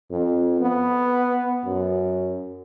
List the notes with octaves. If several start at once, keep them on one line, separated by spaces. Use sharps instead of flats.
F2
B3
F#2